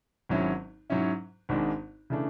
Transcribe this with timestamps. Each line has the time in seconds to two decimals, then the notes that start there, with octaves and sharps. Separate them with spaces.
0.29 G#1 G#2 F#3 C#4 E4
0.90 G#2 F#3 C#4 E4
1.49 G#1 G#2 G#3 D4
2.10 C#3 E3 A3 D4